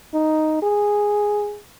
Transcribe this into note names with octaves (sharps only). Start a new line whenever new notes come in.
D#4
G#4